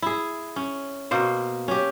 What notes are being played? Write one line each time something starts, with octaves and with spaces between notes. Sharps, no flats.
E4 G#4
C#4
B2 A#3 C5
C#4 G4